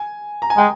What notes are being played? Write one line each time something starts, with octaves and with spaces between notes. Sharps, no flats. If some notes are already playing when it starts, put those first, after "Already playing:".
Already playing: G#5
A#5
G#5
G#3 G5